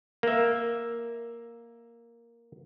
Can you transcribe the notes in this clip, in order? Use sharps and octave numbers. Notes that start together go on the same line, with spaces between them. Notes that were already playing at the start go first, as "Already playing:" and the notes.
A#3 E5